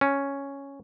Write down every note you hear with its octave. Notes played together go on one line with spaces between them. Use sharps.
C#4